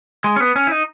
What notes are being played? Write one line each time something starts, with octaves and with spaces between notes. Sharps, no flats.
G#3
C#4
B3
C#4
E4
D#4